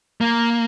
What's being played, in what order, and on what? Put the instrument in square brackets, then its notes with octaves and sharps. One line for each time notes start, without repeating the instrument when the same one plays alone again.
[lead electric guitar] A#3